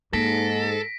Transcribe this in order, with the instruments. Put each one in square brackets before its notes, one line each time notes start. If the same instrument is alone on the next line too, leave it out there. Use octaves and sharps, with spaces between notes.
[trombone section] G#2 [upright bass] A#3 [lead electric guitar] A4 [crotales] A#6 B6 D7